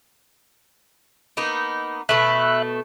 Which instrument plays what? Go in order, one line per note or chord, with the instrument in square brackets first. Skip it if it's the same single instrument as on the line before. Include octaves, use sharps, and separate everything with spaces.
[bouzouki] A#3 B3 D#4
[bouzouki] B2 A3 [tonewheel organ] E5 B5 F#6